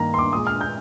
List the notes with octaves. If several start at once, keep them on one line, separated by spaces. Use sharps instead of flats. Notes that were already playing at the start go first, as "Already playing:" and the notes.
Already playing: G2 D#3 A#3 A#5
C6
D6
A#2 G#3 D#6
F6
G6